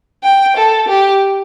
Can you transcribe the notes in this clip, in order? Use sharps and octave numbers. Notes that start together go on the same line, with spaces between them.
G5
A4
G4